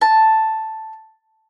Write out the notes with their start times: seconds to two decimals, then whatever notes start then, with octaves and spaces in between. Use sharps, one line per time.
0.01 A5